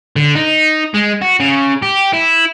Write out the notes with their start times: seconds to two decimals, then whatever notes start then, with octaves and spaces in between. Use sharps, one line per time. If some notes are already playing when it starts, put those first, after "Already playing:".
0.16 D3
0.35 D#4
0.94 G#3
1.21 F#4
1.40 C#3
1.82 G4
2.14 E4